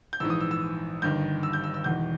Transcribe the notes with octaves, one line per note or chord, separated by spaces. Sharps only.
G6
A#1 G#2 E3 E6
D#6
E6
E6
G1 G2 D#3 G6
E6
G6
E6
E6
E1 E2 D#3 G6